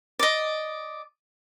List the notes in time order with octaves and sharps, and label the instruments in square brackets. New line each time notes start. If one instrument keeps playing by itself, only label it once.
[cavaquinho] D5 D#5